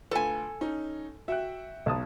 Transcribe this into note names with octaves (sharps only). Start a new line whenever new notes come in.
D2 F4 A4 B4 G#5
C#4 D#4
F#4 E5 G5 F#6
B1 A5 D#6